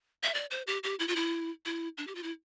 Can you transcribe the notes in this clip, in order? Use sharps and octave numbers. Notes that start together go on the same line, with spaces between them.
E5
D5
C5
G4
G4
E4
F4
E4
E4
D4
G4
F4
E4